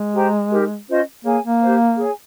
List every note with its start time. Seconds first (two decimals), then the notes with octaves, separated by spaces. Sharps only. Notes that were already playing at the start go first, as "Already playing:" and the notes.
Already playing: G#3
0.15 G4 C5 G5 A#5
0.51 D#4 G4 A#4
0.88 C#4 F4 C5 D#5
1.24 A#3 G#4 C#5 G#5
1.43 A#3
1.61 G4 C5 F5
1.98 G#4 C#5 G#5